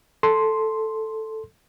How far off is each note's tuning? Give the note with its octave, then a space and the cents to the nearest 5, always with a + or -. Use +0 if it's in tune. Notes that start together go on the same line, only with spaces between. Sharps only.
A4 +0 C6 +0